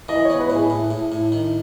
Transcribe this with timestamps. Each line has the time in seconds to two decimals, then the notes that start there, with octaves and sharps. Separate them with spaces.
0.09 E3 D#5
0.25 B3 C#5
0.40 B4
0.50 A2
0.55 G#4
0.70 A2
0.91 A2
1.12 A2
1.32 D#3